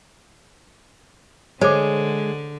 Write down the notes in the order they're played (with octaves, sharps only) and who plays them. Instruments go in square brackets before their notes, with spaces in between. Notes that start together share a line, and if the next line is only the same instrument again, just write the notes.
[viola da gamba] D3 [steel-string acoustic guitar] G#3 [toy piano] C5 D6 [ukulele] C#5